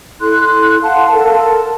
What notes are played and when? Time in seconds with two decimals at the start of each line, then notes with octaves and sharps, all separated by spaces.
0.21 E4 A4 C6 F#6
0.83 F5 F#5 A5 C6
1.12 A4 A#4 A5